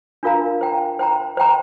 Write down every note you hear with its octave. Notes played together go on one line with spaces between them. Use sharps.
D4 F4 A#4 F5 A#5
C5 G5 A#5
C5 G5 A#5
C5 G5 A#5